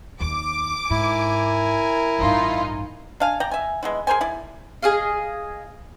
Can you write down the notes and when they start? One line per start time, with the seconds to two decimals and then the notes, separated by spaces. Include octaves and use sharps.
0.20 D#2 D6
0.90 G#2 E4 A#4 G#5
2.19 A1 G2 D#4 F4
3.20 D4 F5 G#5
3.40 D5 G5 A#5
3.51 E5 G#5
3.83 G#3 B3 E4
4.07 G#4 A#4 C5 G#5
4.21 E4 D5
4.83 G#4 D#5 F5